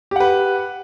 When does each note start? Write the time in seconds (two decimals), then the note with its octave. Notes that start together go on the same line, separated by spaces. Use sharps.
0.11 G4
0.16 F#5
0.20 B4